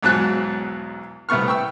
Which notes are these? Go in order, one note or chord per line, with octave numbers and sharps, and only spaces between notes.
B1 E2 G#2 F#3 A5 F#6
C2 A3 B3 C#6 F6
G5 C#6 E6